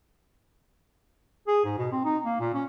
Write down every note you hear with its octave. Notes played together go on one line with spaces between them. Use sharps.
G#4
G#2
B2
C4
D#4
A#3
A#2
C#4